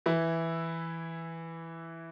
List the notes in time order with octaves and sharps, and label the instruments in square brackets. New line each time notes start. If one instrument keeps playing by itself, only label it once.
[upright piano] E3 E4